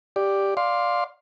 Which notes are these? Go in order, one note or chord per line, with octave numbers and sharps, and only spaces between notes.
G4 D5
D5 F5 C6